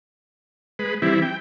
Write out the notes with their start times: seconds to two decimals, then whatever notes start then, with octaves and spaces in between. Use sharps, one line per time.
0.79 G#3 B4
1.02 E3 G3 C4 E4
1.22 G5